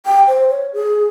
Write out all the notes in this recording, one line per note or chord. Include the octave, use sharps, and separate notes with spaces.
G5
C5
C#5
G#4